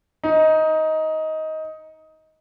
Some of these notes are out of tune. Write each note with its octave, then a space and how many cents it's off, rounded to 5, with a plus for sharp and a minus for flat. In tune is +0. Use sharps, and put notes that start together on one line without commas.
D#4 +15